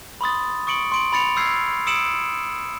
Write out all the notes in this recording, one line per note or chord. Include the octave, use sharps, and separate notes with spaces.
B5 C6 D#6 A6
C#6 D#6 C#7 D7 F#7
C6 D7 F#7
B5 A6 C#7 F7
E6 F6 G6 G#6 C7
D#6 E6 C#7 D7 E7 F#7